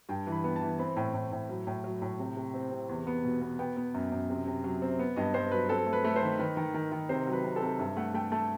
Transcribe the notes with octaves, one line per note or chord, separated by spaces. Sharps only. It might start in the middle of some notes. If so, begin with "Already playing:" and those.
G2 G5
E3
B5
B3
A5
E3
C4 B5
A2
A2
A2
F#3
A2
F#3
A2
C3
C3
C4
C3
E2
B3
B2
B3
B3 G5
B3
F#2
F#2
C3
C3
F#3
C4
B3
G2 D#5
G2 C5
F#3 B4
C4 A4
A3
B4
A3
C5
D#3
D#3 B4
D#3
D#3
D#3
C3 C5
F#3
B4
C3
A4
C3
G2 E5
A3 F#5
A3 G5
A3 A5